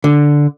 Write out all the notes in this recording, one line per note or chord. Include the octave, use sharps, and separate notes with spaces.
D3